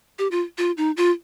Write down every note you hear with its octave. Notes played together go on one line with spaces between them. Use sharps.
G4
F4
F4
D#4
F4